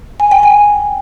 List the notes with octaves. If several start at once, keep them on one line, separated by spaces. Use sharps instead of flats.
G#5
G5
G#5